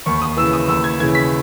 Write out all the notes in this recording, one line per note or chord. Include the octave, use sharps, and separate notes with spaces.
D#2 C#6
D#6
C#3 E3 E6
D#6
D#2 E6
G#6
C#3 E3 G#6
B6